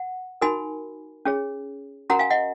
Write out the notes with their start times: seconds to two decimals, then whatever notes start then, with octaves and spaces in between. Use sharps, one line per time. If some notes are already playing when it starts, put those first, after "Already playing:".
Already playing: F#5
0.41 D#4 F#4 A#4 G#5 B5
1.25 C#4 G#4 C#5
2.10 C#4 F#4 A#4 F#5 A#5
2.19 F5 G#5
2.30 D#5 F#5